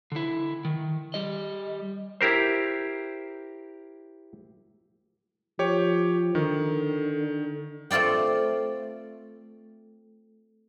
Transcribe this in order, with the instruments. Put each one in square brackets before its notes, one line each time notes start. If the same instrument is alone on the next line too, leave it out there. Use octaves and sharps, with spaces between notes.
[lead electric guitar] D3 E4
D#3
G3 D#5
[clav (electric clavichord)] E4 G4 A#4 C5
[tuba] F3 [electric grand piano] G4 C#5
[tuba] D3 [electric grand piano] D#3
[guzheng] A3 C4 F4 D5 G5